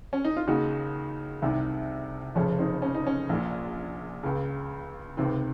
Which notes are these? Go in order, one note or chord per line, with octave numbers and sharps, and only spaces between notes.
C#4
D#4
F4
D#2 C#3 D#4 F#4
C2 C3 D#3
F1 F2 C#3 C#4
C4 D#4
C#4
D#4
C#4
A#1 A#2
C#2 C#3
C#2 C3 D#3 C4